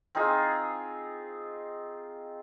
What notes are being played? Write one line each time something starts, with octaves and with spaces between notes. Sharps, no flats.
C4 D#4 F4 G#4